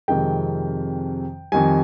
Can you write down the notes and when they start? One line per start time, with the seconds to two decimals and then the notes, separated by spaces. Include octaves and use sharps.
0.08 F2 C3 D#3 G#3 G5
1.52 F2 D#3 G3 G#5